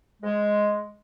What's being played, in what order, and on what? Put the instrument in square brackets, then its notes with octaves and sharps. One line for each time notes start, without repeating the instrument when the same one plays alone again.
[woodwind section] G#3